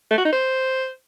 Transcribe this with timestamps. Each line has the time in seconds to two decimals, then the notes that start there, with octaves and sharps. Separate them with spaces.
0.11 A3
0.18 F#4
0.25 D#4
0.32 C5